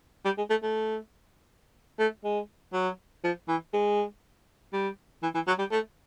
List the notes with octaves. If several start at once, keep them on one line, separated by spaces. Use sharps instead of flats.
G3
G#3
A3
A3
A3
G#3
F#3
F3
E3
G#3
G3
E3
E3
F#3
G3
A3